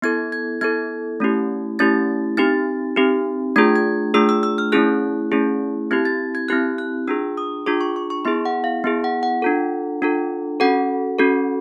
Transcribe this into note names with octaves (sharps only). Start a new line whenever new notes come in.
B3 E4 A4 G#6
G#6
B3 E4 A4 G#6
A3 C#4 E4 G4
A3 C#4 E4 G4 A6
C4 D#4 G4 A6
C4 D#4 G4
A3 D4 F4 G#4 G#6
G#6
A3 D4 F4 G#4 E6
E6
E6
F6
A3 C#4 E4 G#4 F#6
A3 C#4 E4 G#4
C4 E4 G4 G#6
A6
G#6
C4 E4 G4 F#6
F#6
D4 F4 G#4 E6
D#6
D4 F4 G#4 D6
C#6
C#6
C#6
B3 E4 G#4 C6
F#5
F5
B3 E4 G#4
F#5
F#5
D4 F4 A4
D4 F4 A4
C#4 F#4 A4 F#5
C#4 F#4 A4